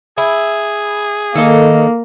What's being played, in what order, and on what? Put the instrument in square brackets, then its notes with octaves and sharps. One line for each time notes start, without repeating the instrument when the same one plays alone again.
[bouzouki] E4 [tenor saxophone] G#4
[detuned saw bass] D#3 [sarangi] A#3 [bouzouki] A4 D#5